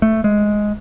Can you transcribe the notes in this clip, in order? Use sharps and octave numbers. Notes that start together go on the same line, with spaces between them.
A3
G#3